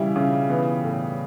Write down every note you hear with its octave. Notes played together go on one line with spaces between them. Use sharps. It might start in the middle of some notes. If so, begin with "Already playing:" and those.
Already playing: C#3 E3 G3 E4
C#3
E3 B3
A2